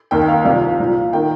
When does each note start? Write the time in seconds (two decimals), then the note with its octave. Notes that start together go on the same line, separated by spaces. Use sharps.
0.11 D#2 D#3 A#3 G5
0.21 G5
0.28 F5
0.45 C2 C3 F3 F5
0.79 C2 A#2 F3
1.13 D#3 A#3 G5